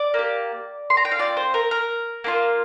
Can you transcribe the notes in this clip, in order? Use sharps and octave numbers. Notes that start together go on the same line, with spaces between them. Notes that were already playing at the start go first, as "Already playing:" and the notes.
Already playing: D5
A#3 G4
C6
A#5
G5
F5
C4 F4 D5
C5
A#4
A#4
A#3 D4 F4